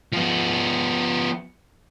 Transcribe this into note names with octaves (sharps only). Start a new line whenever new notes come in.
F3 B3